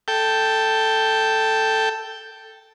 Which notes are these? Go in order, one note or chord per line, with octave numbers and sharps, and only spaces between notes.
A4 G5